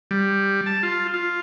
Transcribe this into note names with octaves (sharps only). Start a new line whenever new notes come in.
G3
A5
F4
F4